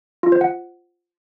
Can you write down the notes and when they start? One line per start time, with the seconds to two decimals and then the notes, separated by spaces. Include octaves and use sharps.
0.23 F4
0.32 C5
0.41 F#5